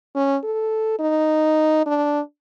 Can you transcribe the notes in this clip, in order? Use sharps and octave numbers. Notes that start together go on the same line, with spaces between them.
C#4
A4
D#4
D4